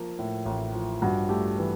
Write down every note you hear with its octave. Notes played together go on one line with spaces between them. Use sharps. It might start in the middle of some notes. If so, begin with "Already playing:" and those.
Already playing: F3 A#3
A2
A1
F3
G2 F#4
A3 G4
E3